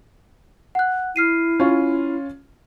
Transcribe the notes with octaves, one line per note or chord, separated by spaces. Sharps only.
F#5 F#6
E4 F6 C7 D#7
C#4 F4